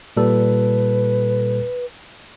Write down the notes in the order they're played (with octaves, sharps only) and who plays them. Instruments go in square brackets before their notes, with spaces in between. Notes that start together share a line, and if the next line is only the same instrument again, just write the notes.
[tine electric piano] A#2 G3 A4 [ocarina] B4